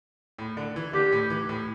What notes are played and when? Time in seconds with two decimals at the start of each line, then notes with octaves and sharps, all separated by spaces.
0.38 A2
0.57 D3
0.76 E3
0.93 D3 G4
1.12 A2
1.30 E3
1.49 A2